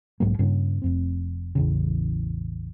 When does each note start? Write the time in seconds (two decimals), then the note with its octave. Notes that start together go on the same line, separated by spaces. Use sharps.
0.20 B1 G#2 F#3 A#3
0.39 G2 C#3 A#3 C#4
0.82 F1 F2 C4
1.55 A1 E2 C#3